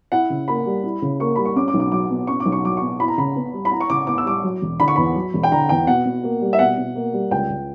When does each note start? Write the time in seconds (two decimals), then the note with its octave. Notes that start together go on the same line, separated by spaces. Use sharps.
0.12 E4 F#5
0.30 C#3
0.48 A#3 B5
0.66 G3
0.84 E4
1.02 C#3
1.20 A#3 C#6
1.36 G3 B5
1.45 C#6
1.56 C#4 D6
1.68 D6
1.74 B1
1.80 D6
1.92 F#3 D6
2.10 B2
2.27 C#4 C#6
2.40 D6
2.45 B1
2.52 C#6
2.64 F#3 D6
2.77 B2 C#6
3.00 E4 B5
3.08 A#5
3.18 C#3 B5
3.36 B3
3.53 G3
3.65 B5
3.72 E4 A#5
3.80 C#6
3.90 C#3 D6
4.07 B3 D6
4.18 E6
4.25 G3 D6
4.44 F#3
4.62 E1
4.80 D3 B5
4.88 C#6
4.96 E2 B5
5.16 F#3
5.34 E1
5.43 G5
5.52 D3 A#5
5.69 E2 G5
5.87 B2 F#5
6.05 B2
6.23 A#3
6.41 G3
6.53 E5
6.59 B2 F#5
6.77 B2
6.95 A#3
7.13 G3
7.31 C#2 G5
7.50 C#2